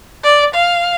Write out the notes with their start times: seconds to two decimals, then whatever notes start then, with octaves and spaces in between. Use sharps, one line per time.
0.24 D5
0.54 F5